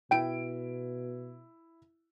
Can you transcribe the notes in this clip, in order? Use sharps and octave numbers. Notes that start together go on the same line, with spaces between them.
B2 E4 G5 D7